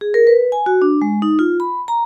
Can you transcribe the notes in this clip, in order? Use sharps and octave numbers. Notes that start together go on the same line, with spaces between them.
G#4
A#4
B4
G#5
F#4
D4
G#3
D#4
F4
B5
A#5